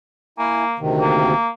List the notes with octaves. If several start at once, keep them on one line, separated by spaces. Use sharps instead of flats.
A#3 E4 G#5
D2 C3 D#3
A#3